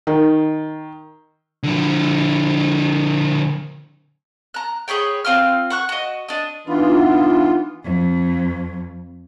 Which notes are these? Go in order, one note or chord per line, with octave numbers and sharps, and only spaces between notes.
D#3
D3 F3
A#5 F#6
G#4 B4 C#5 G5
C4 F4 G5 F6
F#5 C#6 F#6
F#4 D#5
D4 D#5
E3 B3 D4 D#4 F4 B5
F2